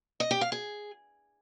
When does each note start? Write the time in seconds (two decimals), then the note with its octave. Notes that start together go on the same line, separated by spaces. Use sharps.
0.20 D#5
0.31 G4
0.41 F5
0.52 G#4